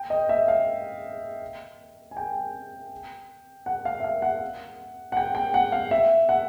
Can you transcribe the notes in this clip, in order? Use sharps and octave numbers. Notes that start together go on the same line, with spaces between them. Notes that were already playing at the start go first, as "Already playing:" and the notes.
Already playing: G5
D#5
E5
F5
G#5
G5
F#5
F5
E5
F5
F#5
F#5
G5
G5
F#5
F5
E5
F#5